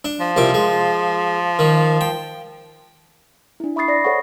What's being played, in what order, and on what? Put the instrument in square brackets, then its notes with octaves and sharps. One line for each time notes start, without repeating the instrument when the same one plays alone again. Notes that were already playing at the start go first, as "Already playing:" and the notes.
[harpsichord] D4
[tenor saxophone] F3
[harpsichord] C2 A#2 D6
G#3
D#3
G5
[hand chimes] D4 E4
E5 B5 C#6 D#6 A6 C7
D5 A#6
A4 C5 C#5 F#5 C#6